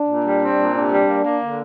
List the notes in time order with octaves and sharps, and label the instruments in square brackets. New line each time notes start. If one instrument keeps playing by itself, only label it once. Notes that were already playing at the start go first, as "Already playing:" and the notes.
Already playing: [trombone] D4
[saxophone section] A#2
G3
C4
A#2
[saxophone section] C3 [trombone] D4
[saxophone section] G3
A#3
A#3
D3